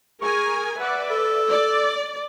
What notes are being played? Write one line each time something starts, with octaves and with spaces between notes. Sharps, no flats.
G#4 A#4 G#5 C#6
B4 D5 E5 F#5
A4
D5